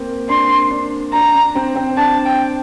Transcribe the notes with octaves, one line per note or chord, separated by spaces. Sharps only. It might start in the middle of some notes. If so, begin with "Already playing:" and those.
Already playing: A#3 C4
D4 C6
D4
D4 A#5
D4
C4
C4
D4 A5
G5